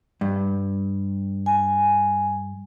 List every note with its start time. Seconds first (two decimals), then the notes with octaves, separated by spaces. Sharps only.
0.21 G2
1.46 G#5